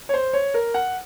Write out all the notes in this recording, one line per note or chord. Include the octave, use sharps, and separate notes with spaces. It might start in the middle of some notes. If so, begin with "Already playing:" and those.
C#5
C5
C#5
A#4
F#5